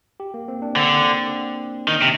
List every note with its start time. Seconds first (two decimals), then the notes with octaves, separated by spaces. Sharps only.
0.20 G4
0.34 A#3
0.48 C4
0.62 D4
0.76 D3 C4
1.88 D#3
2.02 C3